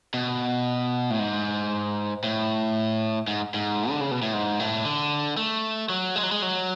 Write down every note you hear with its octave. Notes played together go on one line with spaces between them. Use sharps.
B2
A2
G#2
A2
G#2
G#2
D3
C#3
B2
A2
G#2
A2
D3
A3
F#3
G#3
F#3
G#3
F#3